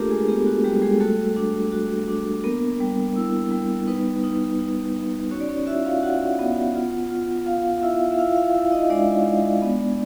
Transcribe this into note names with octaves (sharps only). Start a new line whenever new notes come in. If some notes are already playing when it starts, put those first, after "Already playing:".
Already playing: A3 A#3 D4 F4 G4 A4 A#4
G#3 G#4
B3 G4
F#4
G3 G4
G#3 G#4
A3 F#4 A4
D4
F#4
D4
A#3 B3 A#4
G3
E4
G3
B3 D#4 B4
D#4
D#4
D#4
C#4 F#4 C#5
D5
C#4 C#5
E4 F#4 E5
F4 F5
F#4 F#5
B3
F4
F4
F4 F5
E4 F4 E5
E5
E4 F4 F5
F4 F5
E4 E5
D#4 D#5
G#3 D4 D5
G#3
B3